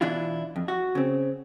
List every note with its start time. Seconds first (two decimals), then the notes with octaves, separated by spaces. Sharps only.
0.01 B2 E3 D4 E4 F4
0.56 F2
0.68 F#4
0.95 C#3 C4